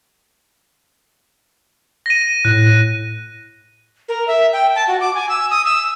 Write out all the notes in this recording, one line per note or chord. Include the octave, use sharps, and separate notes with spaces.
A#6 D#7
A2 F#6
A#4
E5
G5
A5
F#4
D6
G#5
E6
D#6
E6